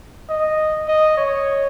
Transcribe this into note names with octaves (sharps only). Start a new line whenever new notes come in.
D#5
D#5
C#5